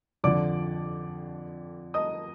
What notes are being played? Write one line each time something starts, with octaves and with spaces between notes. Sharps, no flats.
F2 D3 F3 D5 D6
D#5 D#6